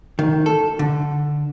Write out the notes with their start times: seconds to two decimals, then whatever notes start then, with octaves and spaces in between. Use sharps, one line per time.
0.19 D#3
0.46 A4
0.79 D3